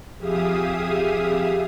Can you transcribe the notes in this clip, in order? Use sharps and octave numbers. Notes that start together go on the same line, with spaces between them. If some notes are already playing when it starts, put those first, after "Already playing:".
F2 G4 G#4 E5 F5 D#6